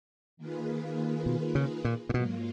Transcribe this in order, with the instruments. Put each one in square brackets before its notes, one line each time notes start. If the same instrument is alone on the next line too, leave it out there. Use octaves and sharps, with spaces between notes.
[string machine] D#3 A#3 F4 G#4 B4
[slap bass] B2
C#3
A#2
A#2
[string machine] G#2 F#3 A#3 F4 [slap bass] B2